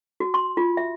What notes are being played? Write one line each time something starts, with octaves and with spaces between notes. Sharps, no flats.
F#4
C6
F4
E5